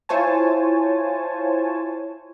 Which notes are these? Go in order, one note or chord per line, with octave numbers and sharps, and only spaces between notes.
E4 F4 C5 C#5 G#5 A5